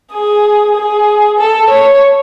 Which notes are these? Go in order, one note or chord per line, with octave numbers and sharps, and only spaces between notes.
G#4
G#4
A4
C#5